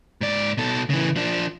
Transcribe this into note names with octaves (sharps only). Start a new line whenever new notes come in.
G#2 D5
B2 A4
C#3 E3
F3 D4